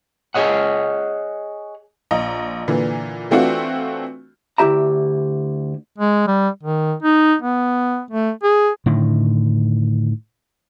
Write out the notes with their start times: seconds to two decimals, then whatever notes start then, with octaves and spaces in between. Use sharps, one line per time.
0.34 G#4 C#5 D#5 F#5
2.11 A#1 D#5 A#5
2.68 A#2 D3 E3
3.31 E3 A3 C4 D4 F4 F#4
4.58 D2 E4 G4 E5 A#5
5.98 G#3
6.27 G3
6.63 D#3
7.03 D#4
7.42 B3
8.11 A3
8.43 G#4
8.86 A2 D3 D#3